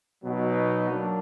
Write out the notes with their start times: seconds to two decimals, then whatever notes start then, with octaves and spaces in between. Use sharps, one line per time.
0.24 B2 F#3 B3 D#4 F#4
0.90 F#3 A#3 D4